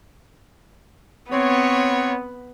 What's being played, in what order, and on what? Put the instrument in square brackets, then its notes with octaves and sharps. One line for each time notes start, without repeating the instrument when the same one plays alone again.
[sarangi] B3 [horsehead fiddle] C4 [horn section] C#5